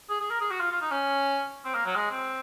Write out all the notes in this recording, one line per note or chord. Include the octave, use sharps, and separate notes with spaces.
G#4
G#4
A#4
G#4
F#4
F4
F4
D#4
C#4
C4
A#3
F#3
G#3
C4